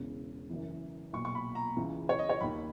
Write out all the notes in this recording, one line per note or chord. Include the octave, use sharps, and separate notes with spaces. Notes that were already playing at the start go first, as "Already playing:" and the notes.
Already playing: E1 E2 C#3
F#1 F#2 E3
B1 A#2 C#6
C#6
B5
A#5
C#2 C#3 E3
C#5
D#5
C#5
D#2 D#3 B5